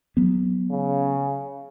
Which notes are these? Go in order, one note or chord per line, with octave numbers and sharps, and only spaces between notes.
F#3 B3
C#3